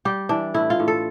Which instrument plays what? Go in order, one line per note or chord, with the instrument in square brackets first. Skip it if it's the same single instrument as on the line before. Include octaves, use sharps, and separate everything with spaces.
[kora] G3 G4
E3 D4
A2 E4
F4
A2
A4